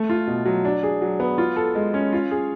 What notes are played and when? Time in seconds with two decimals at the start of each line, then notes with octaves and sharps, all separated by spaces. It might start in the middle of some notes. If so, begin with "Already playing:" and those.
Already playing: A3
0.10 F4
0.27 B2
0.46 F#3
0.65 D4
0.83 G#4
1.01 F#3
1.20 B3
1.38 F4
1.56 A4
1.75 G#3
1.94 C#4
2.13 F4
2.31 G#4